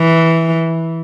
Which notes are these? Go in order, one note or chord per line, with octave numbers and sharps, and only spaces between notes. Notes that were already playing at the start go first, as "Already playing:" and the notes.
Already playing: E3